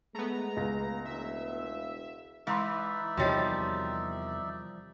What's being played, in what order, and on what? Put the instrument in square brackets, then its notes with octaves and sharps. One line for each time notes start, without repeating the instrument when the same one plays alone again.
[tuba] G#3 [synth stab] A3 B3 [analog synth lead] A#5
[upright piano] C#2 F5 A#6
[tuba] E1 [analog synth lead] E5
[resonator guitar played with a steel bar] E3 [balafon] G#3 A#5 C6 [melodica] D#4 D5 E5
[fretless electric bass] E2 C3 D#3 [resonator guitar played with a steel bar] F3 G3 [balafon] F#4 C#5 D#5